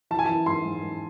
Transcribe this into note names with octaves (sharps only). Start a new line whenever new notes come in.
E3 A5
G#5
E3 A5
G#2 C6
G#2
G#2